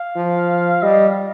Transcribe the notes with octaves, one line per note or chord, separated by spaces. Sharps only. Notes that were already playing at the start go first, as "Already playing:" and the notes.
Already playing: F5
F3
G3 D#5